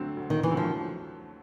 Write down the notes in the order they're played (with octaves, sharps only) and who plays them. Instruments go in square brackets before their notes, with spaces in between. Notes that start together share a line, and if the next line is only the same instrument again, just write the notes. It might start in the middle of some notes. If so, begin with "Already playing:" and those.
Already playing: [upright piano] D2 D3 F#3 A3 C4
D2
[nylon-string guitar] D#3
E3
[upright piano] D3 F#3 A3 C4
[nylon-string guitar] F3